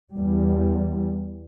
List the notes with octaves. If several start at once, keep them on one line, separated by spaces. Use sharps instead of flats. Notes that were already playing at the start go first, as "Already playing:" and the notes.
E2 G3